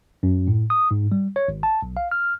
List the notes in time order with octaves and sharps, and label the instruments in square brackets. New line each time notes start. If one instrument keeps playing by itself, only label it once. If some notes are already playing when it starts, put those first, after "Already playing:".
[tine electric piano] F#2
A2
D#6
G#2
G3
C#5
G#1
A5
B1
F5
F6